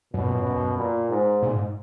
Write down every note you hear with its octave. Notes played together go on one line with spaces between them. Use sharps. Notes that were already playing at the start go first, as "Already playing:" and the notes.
F#2 B2
A#2
F#2
F#2
F#2
A#2
G#2
A#2
G#2